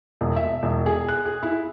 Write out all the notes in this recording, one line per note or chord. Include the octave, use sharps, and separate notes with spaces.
E1
E5
E1
G#4
F#6
G#4
E4